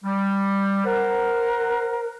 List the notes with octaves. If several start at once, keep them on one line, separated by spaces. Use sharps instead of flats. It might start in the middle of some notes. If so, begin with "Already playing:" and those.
G3
A#4 C5 F#5